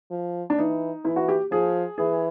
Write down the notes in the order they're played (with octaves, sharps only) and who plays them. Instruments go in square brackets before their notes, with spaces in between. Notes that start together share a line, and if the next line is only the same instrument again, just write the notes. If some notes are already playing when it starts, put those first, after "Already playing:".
[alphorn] F3
[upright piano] D4
[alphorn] E3 [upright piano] D#4
[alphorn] E3 [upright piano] E4
[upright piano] F#4
G4
[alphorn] F3 [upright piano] G#4
[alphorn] E3 [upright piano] G#4